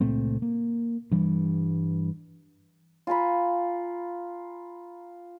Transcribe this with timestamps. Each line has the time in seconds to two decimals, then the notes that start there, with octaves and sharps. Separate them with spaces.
0.01 C#2 A#2 A3 C4
0.42 A#3
1.12 G2 E3 G3
3.07 F4 G#5 A#5 B5